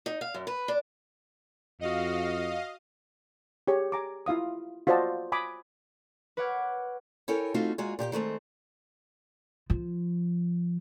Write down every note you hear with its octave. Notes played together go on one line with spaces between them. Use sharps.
D#4
F5
F#2
B4
D4
F2 F#4 D#5 F5
G4 G#4 C#5
G#5 A#5 D6
E4 F4 F5 D#6
F4 F#4 C5 D5 D#5 A5
G#5 B5 D6 D#6
B4 C#5 F#5 D6 F6 G#6
E4 A4 A#4 C#5 G5 G#5
A3 C4 D#4 F4 F#4 F5
G#3 A#3 F4 F#4 G#4
A#2 G4 G#4 G5
D#3 G#3 A3 C4
F3